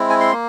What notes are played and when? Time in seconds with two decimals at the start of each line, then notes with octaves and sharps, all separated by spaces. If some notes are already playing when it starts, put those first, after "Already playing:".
Already playing: G#3 C4 E4
0.10 G#5
0.20 C6
0.32 A#3